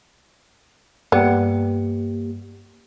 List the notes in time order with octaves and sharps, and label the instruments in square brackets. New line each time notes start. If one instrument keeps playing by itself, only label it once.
[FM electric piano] G2 [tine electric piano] A#3 G4 [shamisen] B3 [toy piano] D5 G5